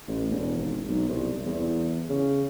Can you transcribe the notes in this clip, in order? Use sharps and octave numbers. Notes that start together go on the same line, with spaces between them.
A1
E1
G#1
B1
C2
E2
C#3